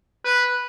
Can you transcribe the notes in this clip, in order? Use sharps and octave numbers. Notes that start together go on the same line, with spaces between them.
B4